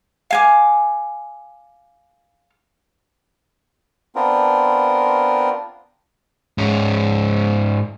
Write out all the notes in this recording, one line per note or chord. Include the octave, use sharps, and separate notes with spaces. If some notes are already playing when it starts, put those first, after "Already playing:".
F5 G#5 D6
B3 C4 D4 F4 A#4
G#2 C#4